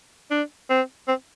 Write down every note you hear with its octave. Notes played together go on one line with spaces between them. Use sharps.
D4
C4
C4